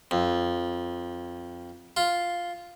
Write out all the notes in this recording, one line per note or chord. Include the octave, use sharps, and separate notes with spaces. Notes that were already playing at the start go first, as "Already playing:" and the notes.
F2
F4